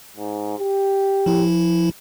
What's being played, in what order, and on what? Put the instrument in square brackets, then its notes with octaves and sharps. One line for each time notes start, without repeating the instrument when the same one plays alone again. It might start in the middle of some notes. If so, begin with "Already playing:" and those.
[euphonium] G#2
G4
[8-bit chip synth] F3 E4